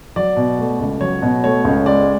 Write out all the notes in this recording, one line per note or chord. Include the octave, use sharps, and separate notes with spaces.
F#3 D5
B2
A3
C#2
F#3 C#5
B2
A3 C#5
C#2
G#3 D5